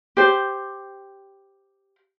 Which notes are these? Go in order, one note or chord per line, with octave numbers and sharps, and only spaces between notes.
G4 C5